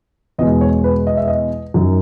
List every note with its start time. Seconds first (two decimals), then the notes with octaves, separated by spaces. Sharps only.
0.38 E2 B2 G#3 D#5
0.61 C#5
0.84 B4
1.07 D#5
1.17 E5
1.28 D#5
1.74 F#2 D#3 F#3